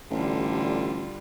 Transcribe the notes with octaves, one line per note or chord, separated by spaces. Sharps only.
A1 D3 G3 F4